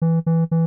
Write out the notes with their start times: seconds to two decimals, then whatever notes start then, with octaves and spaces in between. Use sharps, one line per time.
0.02 E3
0.26 E3
0.51 E3